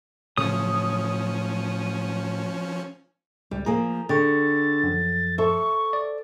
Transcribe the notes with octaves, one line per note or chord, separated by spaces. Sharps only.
A2 C#3 F3 F#3 C#4 D#6
C#2 G3
F3 A#3 G#4 A#5
D3 G#4 G5 C#6 A6
F#2 F3
A4 C5 E5 C#6
D5